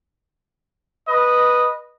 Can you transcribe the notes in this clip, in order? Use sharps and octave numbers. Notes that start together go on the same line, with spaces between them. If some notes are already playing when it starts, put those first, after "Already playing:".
B4 D#5